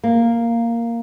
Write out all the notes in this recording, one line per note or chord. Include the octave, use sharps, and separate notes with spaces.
A#3